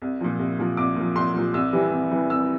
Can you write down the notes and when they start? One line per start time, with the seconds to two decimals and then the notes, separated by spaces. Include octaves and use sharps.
0.02 C2
0.21 A#2 F3
0.39 C2
0.59 A#2 F3
0.77 C2 D6
0.96 A#2 F3
1.15 C2 C6
1.35 A#2 F3
1.54 C2 E6
1.73 C3 E3 G3
1.92 C2
2.11 C3 E3 G3
2.30 C2 E6